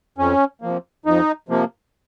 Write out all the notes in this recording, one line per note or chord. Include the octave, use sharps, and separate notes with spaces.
F2 C#4
C3 F3 A#3
F2 D#4
C3 F3 A#3